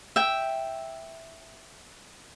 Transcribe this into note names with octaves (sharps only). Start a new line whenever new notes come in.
E5 G5